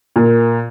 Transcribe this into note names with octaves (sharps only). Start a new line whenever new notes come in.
A#2